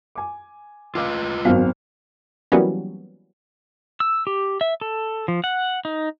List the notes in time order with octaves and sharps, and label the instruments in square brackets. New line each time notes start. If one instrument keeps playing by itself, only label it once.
[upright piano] G#5 D6
[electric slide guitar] F4 B4 D#5 [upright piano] F5 D6 E6
[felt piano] G#1 F#3 F5 [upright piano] F#2 C4 F6 [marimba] B3
[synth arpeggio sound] E3 F#3 G3 A#3 B3 C#4
[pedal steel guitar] E6
G4
E5
A4
F3
F#5
D#4